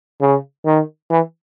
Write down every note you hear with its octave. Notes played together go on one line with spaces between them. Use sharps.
C#3
D#3
E3